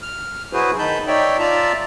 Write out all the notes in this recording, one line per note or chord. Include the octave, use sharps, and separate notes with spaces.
F6
F#3 E4 F#4 G#4 B4 C5
D#3 D#4 A5 B5 G6
D#4 C#5 D5 E5 G5
F4 D5 E5 A5 A#5